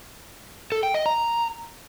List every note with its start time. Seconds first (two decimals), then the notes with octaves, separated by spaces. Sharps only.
0.72 A4
0.83 G5
0.94 D#5
1.06 A#5